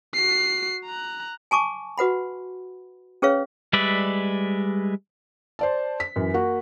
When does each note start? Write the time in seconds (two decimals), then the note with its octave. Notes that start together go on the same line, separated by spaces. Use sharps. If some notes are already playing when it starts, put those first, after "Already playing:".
0.15 F#4 C7
0.85 A#5 F#6
1.51 G#5 A5 C#6 D6
1.98 F#4 B4 F#5 B5
3.22 C#4 G#4 B4 C#5 F5
3.73 G3 G#3 B4 D5 E5
5.59 C5 D5 A5
6.00 B6
6.16 F#2 E3
6.34 A#3 F#4